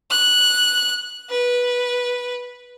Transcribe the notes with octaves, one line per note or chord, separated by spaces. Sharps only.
F#6
B4